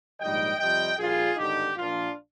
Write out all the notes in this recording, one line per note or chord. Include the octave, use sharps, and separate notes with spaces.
A#1 G#2 D#3 G3 D#5 G5
F2 C3 G3 D#5 G5
A#1 A#2 G3 F4 G#4
G#1 G2 D3 D#4 G4
A#1 A#2 F3 D4 F4